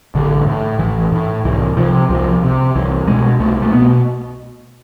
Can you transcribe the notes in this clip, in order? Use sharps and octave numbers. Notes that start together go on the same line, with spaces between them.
A1 D3
A2
A1 E3
A2
C2 E3
C3 F3
C2 F3
C3
C2 E3
B2 G#3
C2 A3
A3
B2 B3